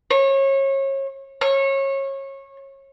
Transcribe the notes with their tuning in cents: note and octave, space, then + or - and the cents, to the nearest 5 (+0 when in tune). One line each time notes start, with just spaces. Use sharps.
C#5 -30
C#5 -25